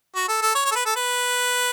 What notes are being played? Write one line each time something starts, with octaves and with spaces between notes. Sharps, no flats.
F#4
A4
A4
C#5
C#5
A4
B4
A4
B4